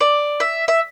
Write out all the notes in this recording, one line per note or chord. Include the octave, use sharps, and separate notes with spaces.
D5
E5
E5